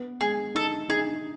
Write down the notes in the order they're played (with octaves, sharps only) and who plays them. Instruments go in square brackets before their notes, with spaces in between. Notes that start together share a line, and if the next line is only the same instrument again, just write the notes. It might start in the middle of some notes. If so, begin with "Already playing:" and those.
Already playing: [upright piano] B3
[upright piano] G#3 [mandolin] G#4
[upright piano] D#4 [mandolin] A4
[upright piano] D#4 [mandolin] G#4